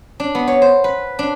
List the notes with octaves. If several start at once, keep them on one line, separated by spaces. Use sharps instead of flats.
D4
B3
C#5
C5
B4
D4